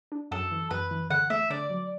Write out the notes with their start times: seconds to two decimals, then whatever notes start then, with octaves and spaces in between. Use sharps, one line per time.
0.12 D4
0.31 F#2 A4
0.51 E3
0.71 F#2 B4
0.91 E3
1.10 D3 F#5
1.30 A3 E5
1.50 D3 D5
1.70 F#3